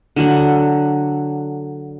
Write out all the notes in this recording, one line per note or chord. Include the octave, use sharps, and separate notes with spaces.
D3 F#3 F#5